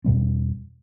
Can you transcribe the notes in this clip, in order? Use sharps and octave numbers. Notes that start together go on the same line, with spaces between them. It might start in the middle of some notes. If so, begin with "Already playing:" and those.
E2 B2 G3 C4